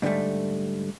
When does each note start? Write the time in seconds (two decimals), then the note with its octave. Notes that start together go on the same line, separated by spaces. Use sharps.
0.02 G#2 D3 E3 G3 A3